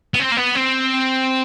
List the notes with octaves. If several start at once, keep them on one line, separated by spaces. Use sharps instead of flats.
B3
C4
A#3
B3
C4